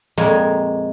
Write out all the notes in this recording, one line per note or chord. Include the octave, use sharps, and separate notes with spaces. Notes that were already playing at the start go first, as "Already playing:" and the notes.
F2 A#2 G#3 A#3 G#4 C#5